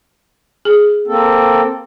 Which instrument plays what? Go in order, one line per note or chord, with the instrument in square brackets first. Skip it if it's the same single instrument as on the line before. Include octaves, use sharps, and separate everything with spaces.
[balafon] G#4
[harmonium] A#3 C4 A4